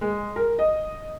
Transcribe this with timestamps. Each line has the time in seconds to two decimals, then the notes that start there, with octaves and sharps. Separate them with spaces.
0.01 G#3
0.36 A#4
0.59 D#5